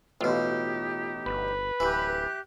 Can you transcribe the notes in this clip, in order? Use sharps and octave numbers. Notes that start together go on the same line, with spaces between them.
A1 B2 D#4 F4 G4
G1 B4
D1 E3 G4 E5 F#6